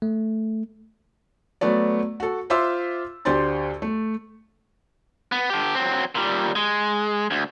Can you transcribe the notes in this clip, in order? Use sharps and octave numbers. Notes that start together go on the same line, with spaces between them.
A3
F#3 A3 B3 D5
F#4 A4
F4 C5 E5 C6 D6 E6
D2 G4 C5 D5 C6 A6
A3
B3
D3 G4
F#3 C4
A#2 G3
G#3
D2